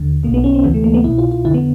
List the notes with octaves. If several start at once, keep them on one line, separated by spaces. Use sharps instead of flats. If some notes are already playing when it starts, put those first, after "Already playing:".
Already playing: D#2 D3
B1 B2 A#3
B3
C#4
C4
D2 C3 E3 B3
A3
A#3
B3
C2 B2 E4
F4
F4
F2 D3 E4
B3